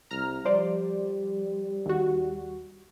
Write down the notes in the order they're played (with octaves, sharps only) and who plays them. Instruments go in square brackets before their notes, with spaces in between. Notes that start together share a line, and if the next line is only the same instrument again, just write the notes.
[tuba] C2 [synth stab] A#5 F6
[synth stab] F3 C5 D5 [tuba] G3
[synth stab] D#2 F#4